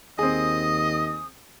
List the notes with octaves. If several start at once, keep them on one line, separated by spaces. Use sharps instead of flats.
D#2 C4 G#4 D#5 D#6